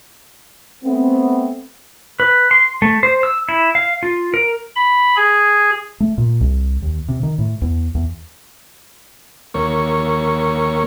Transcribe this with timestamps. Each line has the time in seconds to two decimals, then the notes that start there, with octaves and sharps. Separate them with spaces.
0.84 A3 B3 C4
2.20 B4
2.51 C6
2.82 A3
3.03 C5
3.23 E6
3.49 E4
3.75 F5
4.03 F4
4.34 A#4
4.75 B5
5.16 G#4
6.00 A3
6.18 A#2
6.41 C2
6.82 D#2
7.08 C3
7.23 D#3
7.38 A2
7.62 E2
7.95 E2
9.54 D#2 A#3 A#4 C#5 C#6